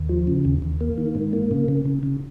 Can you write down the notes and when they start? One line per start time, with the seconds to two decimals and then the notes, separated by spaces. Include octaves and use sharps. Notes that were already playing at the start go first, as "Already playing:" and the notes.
Already playing: D#2
0.09 F3
0.27 C#3
0.45 D#2
0.62 D#2
0.81 A#3
0.98 D#3
1.15 G#2
1.33 A#3
1.51 C#3
1.68 C#3
1.85 C#3
2.03 C#3